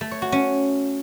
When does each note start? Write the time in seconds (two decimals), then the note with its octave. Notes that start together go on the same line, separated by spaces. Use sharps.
0.01 A3
0.11 C#5
0.22 F#4
0.32 C#4